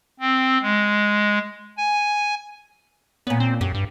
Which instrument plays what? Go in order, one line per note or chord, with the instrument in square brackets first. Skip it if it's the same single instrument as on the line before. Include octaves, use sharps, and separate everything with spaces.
[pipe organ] C4
G#3
G#5
[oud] A#2 C#4 [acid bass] B3
[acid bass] C4
[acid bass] F#2 [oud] G4
[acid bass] G2